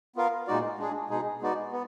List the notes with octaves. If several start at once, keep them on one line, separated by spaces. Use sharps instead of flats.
B3 F4 A#4 F5
A#2 G#3 D#4 F#4 D5
G#3 D4 G#4
B2 G#3 D#4 G#4
G#3 B3 D#4 F#4 D5
B3